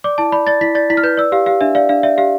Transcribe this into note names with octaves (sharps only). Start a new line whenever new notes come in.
D5 D6
E4 A5
D5 B5
D5 A6
E4 B6
D5 A6
E4 B6
F6
B4 G6
D5 E6
G4 F5
G4 F5
D4 E5
D5 F5
D4 F5
D5 E5
G4 F5